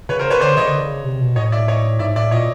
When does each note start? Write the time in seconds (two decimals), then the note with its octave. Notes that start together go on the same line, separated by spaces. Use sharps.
0.09 C#3 B4 C#5
0.19 A#4 C5
0.30 B4 C#5
0.41 D3 C5 D5
0.57 C#3 C#5 D#5
0.68 D3
0.80 C#3
1.04 C3
1.21 B2
1.36 A2 C#5 D#5
1.52 D5 E5
1.68 C#5 D#5
1.99 G#2 D5 E5
2.15 A2 D5 E5
2.31 A#2 C#5 D#5